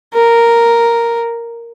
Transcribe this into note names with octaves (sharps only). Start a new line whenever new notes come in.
A#4